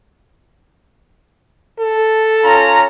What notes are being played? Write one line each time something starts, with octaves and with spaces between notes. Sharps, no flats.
A4
C#4 F4 A#5